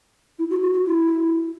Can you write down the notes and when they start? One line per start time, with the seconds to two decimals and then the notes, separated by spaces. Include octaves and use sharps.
0.39 E4
0.50 F#4
0.62 F#4
0.73 F#4
0.86 E4